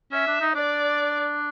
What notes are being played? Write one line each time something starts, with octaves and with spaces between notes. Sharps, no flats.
C#4 E5
D4
D#4
D4 D5